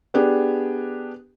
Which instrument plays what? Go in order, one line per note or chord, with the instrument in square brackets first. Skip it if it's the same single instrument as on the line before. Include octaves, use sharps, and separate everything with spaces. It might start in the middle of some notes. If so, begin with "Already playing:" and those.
[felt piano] B3 D4 G4 G#4